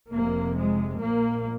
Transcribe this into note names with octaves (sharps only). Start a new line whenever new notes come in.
F1 F2 C3 A#3
G#3
A#1 A#2 A#3